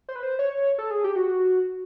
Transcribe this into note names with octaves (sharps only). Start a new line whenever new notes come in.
C5
B4
C5
C#5
A4
G#4
G4
F#4